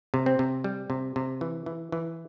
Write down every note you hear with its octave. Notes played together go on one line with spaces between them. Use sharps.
C3
C4
C3
G3
C3
C3
E3
E3
E3